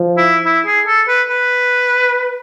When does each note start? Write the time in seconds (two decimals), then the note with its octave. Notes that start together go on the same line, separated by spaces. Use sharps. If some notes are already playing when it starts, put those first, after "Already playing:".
Already playing: F3
0.17 E4
0.45 E4
0.66 G#4
0.87 A4
1.08 B4
1.30 B4